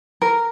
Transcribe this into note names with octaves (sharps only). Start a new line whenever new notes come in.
A#4